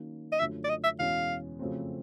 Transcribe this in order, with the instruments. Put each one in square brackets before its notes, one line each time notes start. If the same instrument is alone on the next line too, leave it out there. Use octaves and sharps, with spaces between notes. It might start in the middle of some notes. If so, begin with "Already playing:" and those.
Already playing: [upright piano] D#3 F#3 A#3 C#4
[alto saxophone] D#5
[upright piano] F#2 D3 F3 A3 [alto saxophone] E5
[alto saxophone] D5
D#5
E5
[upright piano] E2 B2 G#3 C#4 [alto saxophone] F5
[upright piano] F2 C#3 F#3 A3 C4